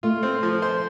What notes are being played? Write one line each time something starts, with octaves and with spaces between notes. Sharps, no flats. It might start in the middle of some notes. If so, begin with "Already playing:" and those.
A3 F4
C4
F3
C5